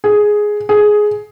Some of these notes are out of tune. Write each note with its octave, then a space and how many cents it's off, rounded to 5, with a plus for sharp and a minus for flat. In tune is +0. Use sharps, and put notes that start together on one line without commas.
G#4 +5
G#4 +10